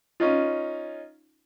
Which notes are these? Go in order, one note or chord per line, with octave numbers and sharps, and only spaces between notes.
C#4 D#4 F4